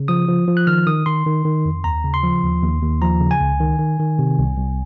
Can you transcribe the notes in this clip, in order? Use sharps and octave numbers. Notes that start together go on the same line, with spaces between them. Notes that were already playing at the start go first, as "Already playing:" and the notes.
Already playing: C#3
F3 D#6
F3
F3
F#6
D#3 F6
D#3 D#6
D#3 C6
D#3
D#3
F2
D#2 A#5
C#3
C6
F3
D#2
D#2
D#2
F3 A#5
C#3
G#5
C#2
D#3
D#3
D#3
C3
C2
C2